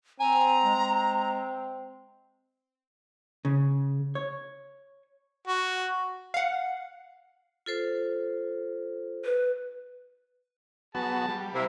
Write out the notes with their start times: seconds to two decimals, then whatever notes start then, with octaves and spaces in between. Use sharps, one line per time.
0.20 C4 G#5 A#5
0.63 G#3
3.45 C#3
4.15 C#5
5.47 F#4
6.34 F5 F#5
7.66 F4 A4 C5
9.24 B4
10.95 F#3 B3 F#4 G#4 A5
11.29 G3
11.54 C3 A#3 E4